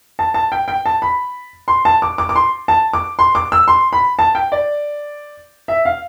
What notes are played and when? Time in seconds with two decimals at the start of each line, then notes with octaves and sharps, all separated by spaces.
0.19 A5
0.34 A5
0.52 G5
0.68 G5
0.86 A5
1.02 B5
1.68 C6
1.85 A5
2.02 D6
2.18 D6
2.29 D6
2.36 C6
2.68 A5
2.93 D6
3.19 C6
3.35 D6
3.52 E6
3.68 C6
3.93 B5
4.19 A5
4.35 G5
4.52 D5
5.68 E5
5.85 F5